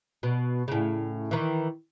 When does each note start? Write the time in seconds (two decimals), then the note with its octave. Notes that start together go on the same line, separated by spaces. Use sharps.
0.23 B2
0.68 A2 C#3
1.31 D#3 E3